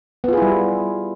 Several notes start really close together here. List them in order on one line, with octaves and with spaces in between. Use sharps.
B3 F4 G#4 E4 G3